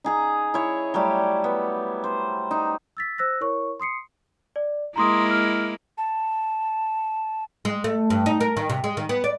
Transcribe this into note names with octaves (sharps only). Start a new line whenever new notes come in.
D#4 G#4 A#5
E4 C#5
F#3 G3 A3 G4
B3
C5
D#4
E6 A6 B6
C5 E6 F#6 A#6
E4 A#4 C#5 C#6
C6 D#6 C7 C#7
D5
G#3 A#3 E4 A#5 C6 D#6
F6
A5
G#3
A3
G2
D#4
A#4
D#3
C3
G#3
D#3
B3
D5